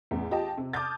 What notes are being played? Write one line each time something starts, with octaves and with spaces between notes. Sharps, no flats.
A1 E2
F4 G4 D#5 G5 A5
C3
A5 D6 D#6 F6 G6 A6